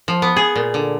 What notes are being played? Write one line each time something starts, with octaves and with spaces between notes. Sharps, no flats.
F3
B3
G#4
A#2
D3